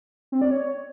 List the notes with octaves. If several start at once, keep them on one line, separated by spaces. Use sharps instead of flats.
C4
D5
C#5